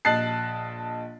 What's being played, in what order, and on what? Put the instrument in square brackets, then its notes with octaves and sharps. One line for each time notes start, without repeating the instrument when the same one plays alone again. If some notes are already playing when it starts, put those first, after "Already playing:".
[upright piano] A#1 D#5 A5 F#6 A6 C7